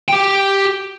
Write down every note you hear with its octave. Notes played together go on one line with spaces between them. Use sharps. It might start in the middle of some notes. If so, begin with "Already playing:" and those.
G4 G5